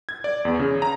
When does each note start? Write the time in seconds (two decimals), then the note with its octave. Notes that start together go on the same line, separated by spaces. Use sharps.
0.09 G#6
0.24 D5
0.45 E2
0.59 C#3
0.82 A#5